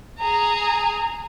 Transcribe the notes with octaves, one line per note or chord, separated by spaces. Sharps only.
G#4 A#5